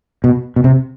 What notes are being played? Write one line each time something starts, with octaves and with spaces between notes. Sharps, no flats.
B2
B2
C3